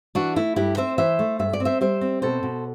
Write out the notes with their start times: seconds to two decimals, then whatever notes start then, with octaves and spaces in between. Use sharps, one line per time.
0.15 E3 D4 F#4
0.36 A3 E4
0.56 G2 E4 G4
0.77 C4 C5 E5
0.98 E3 C5 E5
1.19 A3
1.39 G2 E5
1.53 D5
1.60 C4
1.65 C5 E5
1.81 G3 C5 E5
2.01 C4
2.22 B2 A4 C5
2.43 B2